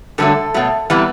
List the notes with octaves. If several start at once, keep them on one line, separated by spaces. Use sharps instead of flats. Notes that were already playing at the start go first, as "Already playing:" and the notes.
G2 D3 F#3 A3 A4
B2 F#3 A3
C3 E3 G3 B3